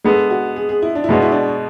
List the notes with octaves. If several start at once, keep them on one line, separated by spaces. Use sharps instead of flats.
G#3 B3 D4 G#4 A4
F#4
G#4
G#4
E4
D4
E4
B2 G#3 B3 D4 F#4
E4
D4